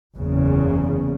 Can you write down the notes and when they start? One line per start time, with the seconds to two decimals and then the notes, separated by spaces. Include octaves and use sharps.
0.15 F#1 E2 C#3